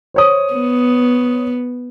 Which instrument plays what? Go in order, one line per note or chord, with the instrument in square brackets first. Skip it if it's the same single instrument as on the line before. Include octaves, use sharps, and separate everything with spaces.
[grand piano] C5 C#5 D#6
[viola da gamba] B3